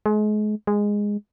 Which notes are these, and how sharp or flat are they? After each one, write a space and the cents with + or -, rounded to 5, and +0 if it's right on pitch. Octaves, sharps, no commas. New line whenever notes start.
G#3 +35
G#3 -10